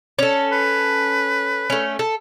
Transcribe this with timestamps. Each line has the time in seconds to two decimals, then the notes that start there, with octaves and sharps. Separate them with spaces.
0.19 C#4 A4
0.52 B4
1.70 A3 C#4
1.99 A4